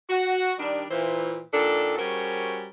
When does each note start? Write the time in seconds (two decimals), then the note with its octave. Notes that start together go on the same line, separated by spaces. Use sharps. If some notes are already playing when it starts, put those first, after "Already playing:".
0.10 F#4
0.59 D#3 G3 D4
0.91 A#2 E3 C5
1.53 A#2 D#3 D4 A4
1.98 G3 C#4 F#4 G#4 A#4 C5